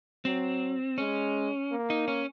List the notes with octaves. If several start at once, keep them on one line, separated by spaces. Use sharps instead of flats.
F#3 C4
G#3 C#4
A#3
D#4
C#4